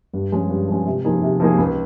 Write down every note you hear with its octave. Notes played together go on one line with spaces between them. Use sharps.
G2
F3 G#3 C#4
G2
F3 G#3 C#4
C3
F3 A#3 D#4 G#4
C3
F3 A#3 D#4 G#4
C#2